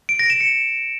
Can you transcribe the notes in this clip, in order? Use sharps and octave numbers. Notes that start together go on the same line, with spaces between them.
D7
A#6
E7
C#7